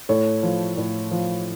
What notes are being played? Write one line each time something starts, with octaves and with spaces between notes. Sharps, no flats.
A2 A4 C#5
F3
A2
F3